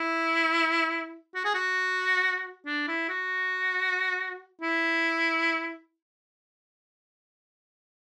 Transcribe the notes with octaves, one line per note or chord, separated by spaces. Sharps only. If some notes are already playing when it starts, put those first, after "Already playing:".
Already playing: E4
F#4
G#4
F#4
D4
E4
F#4
E4